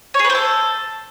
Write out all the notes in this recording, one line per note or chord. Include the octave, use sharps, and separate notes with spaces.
C#5
G#4
B4
C5
A4